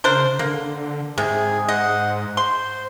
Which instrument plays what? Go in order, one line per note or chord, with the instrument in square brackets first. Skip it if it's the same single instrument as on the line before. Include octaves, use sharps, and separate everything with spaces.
[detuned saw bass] C#3 [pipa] D4 A#4 C5
[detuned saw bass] D3 [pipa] A#3
[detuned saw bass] G#2 [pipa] C3 [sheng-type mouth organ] G#4
[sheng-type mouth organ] C5 F#5 [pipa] D#5
[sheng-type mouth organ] C5 [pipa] C6